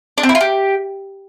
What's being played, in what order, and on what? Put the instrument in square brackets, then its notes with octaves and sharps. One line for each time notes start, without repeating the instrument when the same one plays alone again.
[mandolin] D4
C4
E4
F4
G4